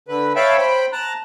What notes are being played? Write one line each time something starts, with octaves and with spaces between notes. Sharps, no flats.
D3 B4
C#5 E5 F5 G5 A5 B5
C5 G5 B5
A5 A#5 F#6